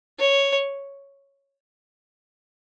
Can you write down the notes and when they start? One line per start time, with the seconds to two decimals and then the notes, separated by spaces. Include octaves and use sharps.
0.19 C#5